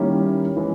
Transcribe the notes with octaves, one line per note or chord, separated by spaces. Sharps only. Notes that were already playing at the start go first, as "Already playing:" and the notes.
Already playing: D#3 G3 A#3 C#4 E4
E3 G#3 C#4 G#4